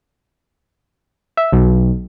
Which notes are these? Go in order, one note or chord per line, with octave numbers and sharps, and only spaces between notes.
E5
B1